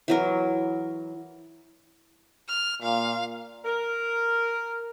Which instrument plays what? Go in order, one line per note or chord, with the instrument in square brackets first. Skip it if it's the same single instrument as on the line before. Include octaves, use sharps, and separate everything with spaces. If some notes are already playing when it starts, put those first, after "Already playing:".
[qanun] E3 F#3 A#4
[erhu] F6
[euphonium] A#2 [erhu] F5
[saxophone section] A#4